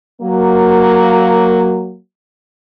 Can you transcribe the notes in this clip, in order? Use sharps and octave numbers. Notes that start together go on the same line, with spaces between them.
F#3 A#3